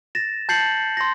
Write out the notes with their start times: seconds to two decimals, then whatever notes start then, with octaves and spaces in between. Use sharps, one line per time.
0.15 A6 A#6 E7
0.49 A5 G6 A6 C7 C#7 F#7
0.97 C6 A#6